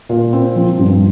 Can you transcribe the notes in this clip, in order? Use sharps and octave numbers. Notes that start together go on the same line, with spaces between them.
A#2
C4
F3
G2